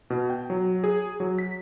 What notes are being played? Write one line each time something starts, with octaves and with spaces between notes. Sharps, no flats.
B2
G5
F#3
G#4
F#3
B6